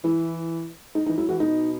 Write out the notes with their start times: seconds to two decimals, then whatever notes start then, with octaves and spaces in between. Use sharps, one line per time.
0.04 E3 E4
0.95 D#4
1.06 E3 D#4
1.17 F#3 E4
1.29 E3 F#4
1.40 B2 D#4